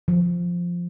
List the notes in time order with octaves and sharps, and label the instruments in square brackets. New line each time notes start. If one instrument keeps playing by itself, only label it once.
[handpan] F3